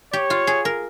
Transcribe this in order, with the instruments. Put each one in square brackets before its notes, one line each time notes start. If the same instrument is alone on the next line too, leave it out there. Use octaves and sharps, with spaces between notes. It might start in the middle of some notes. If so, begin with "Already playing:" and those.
[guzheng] G4 [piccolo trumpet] C#5
[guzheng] F4
G#4
A#4